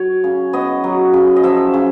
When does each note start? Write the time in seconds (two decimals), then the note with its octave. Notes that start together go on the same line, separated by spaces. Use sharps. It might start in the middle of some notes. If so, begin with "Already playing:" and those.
Already playing: F#3 C#5
0.24 C#3
0.53 B3 D#5
0.84 F#3
1.13 C#3
1.36 D#5
1.43 F3 E5
1.74 C#3